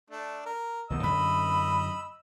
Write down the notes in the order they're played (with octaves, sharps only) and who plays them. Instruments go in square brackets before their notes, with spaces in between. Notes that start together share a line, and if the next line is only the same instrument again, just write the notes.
[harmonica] A3 D4
A#4
[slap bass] C2 D#3 B3 [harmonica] D#5 E6
[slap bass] F#2 D3 [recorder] B5